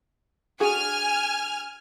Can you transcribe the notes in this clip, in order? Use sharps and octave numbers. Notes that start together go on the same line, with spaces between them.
D4 F#4 G#4 G#5 F6